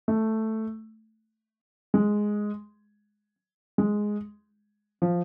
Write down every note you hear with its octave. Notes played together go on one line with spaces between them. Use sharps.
A3
G#3
G#3
F3